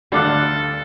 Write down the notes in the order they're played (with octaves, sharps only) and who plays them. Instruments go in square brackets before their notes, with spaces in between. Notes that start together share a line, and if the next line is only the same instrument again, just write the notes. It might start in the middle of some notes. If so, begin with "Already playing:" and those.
[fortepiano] D2 D6 F#6 [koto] G3 F5 F#5 [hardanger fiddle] A4